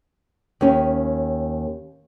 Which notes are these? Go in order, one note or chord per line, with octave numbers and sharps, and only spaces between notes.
D#2 C#4